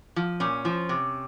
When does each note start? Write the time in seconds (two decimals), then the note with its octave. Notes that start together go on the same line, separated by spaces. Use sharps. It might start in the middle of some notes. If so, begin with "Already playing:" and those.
0.16 F3
0.40 A#2 C#4
0.65 F3
0.89 C3